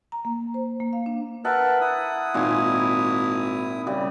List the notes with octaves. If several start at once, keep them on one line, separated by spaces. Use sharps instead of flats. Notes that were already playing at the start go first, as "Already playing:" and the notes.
A#5
A#3
C5
A#3
F5
D4
A#4 B4 E5 F#5 A5
E4 D#6
G#1 A#2 G#5
C#3 G3